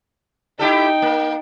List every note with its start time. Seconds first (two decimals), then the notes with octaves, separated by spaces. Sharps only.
0.59 D#4 E4 G4 A4 G5
1.02 A#3